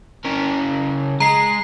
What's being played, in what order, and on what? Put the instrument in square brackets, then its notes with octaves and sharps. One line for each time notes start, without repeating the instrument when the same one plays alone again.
[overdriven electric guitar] C#3 A#4
[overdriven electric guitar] G#3 [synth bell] A#5 C7